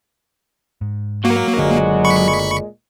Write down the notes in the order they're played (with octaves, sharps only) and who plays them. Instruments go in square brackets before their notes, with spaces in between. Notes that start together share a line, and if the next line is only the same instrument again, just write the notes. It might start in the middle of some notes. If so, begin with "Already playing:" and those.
[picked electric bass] G#2
[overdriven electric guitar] F#3 F#4 [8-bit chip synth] A#3
[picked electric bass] F#1 D3 D4 [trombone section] D2 A#2 G#3
[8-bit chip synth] B5 C#6 C#7